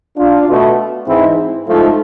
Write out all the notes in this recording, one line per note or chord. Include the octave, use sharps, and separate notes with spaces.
D4 F4
B2 A3
G#2 E3 G#3 C4 E4
G#2 F3 A3